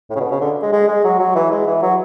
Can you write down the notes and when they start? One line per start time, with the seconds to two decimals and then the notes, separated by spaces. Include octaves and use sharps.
0.10 A2
0.15 C#3
0.20 B2
0.31 C#3
0.41 D3
0.62 G#3
0.73 G#3
0.89 G#3
1.04 F#3
1.20 F#3
1.36 E3
1.51 G#3
1.67 E3
1.82 F#3